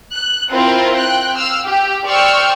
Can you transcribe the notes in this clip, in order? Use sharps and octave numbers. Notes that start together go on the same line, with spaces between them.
F#6
C4 E4 F4 A#4 C5
G5 F#6
F5 E6 F6
G4
C5 D5 G5 C#6 E6 F6